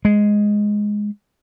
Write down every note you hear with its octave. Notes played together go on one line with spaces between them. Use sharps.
G#3